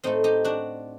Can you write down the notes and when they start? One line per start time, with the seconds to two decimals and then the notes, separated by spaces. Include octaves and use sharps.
0.04 A2 A3 C4 D#4
0.24 D#4 G4
0.44 D4 F#4